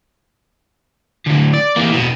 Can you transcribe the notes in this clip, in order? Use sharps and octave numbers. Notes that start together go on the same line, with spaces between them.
A2 D3
D5
E3 A#3
E2 B2